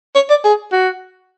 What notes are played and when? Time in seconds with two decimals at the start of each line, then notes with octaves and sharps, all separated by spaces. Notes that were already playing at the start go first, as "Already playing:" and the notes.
0.15 C#5
0.30 D5
0.45 G#4
0.72 F#4